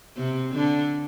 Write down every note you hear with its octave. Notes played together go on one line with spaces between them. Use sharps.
C3 C4
D3 D4